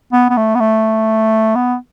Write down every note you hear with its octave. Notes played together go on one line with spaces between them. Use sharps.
B3
B3
A3
B3
A3
B3